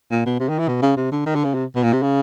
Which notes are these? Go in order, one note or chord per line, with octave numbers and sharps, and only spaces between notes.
A#2
B2
C3
D#3
E3
B2
C#3
C3
D3
D#3
D3
C#3
C3
B2
A#2
C3
C#3